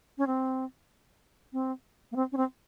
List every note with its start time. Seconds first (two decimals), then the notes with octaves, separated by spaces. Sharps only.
0.18 C#4
0.27 C4
1.53 C4
2.12 A#3
2.16 C4
2.32 C#4
2.37 C4